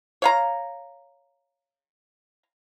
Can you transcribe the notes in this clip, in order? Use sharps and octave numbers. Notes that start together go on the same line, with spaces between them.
C#5 F5 A#5